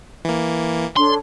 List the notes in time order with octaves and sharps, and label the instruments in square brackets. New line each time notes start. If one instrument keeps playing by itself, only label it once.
[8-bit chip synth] E3 A#3
[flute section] D4 A4 C#5 [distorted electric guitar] C6